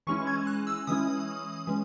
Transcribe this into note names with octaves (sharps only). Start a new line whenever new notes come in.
E3 G#3 C#4 E4 C#6
G#6
F#6
E6
E3 G#3 C#4 E4 D#6
E3 G#3 C#4